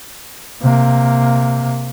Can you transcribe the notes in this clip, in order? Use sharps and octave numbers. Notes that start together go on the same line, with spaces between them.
C3 A#3